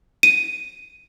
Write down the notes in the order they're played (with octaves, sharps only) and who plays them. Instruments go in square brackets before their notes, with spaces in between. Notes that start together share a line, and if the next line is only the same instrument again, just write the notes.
[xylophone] D#7